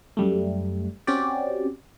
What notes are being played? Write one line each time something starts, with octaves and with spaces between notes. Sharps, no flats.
F#2 G3 A3
C4 C#4 F#4 G4 D5